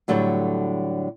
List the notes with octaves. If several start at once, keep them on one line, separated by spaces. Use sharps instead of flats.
A2 D3 F#3 G3 A4 C#5